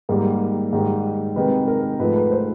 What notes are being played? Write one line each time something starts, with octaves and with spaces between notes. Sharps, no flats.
G#2 D#3 G3 A#3 A#4
G#2 D#3 G3
C3 D#3 G#3 B4
A#4
G#2 F3 A3 B4
B4
C5